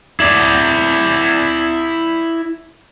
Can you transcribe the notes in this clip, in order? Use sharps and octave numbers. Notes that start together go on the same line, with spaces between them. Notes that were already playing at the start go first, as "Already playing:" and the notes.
E4 D5